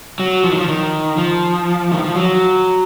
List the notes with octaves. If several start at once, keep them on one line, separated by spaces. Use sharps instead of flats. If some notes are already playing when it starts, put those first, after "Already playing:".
F#3
F3
D#3
F3
D#3
F3
D#3
F3
F#3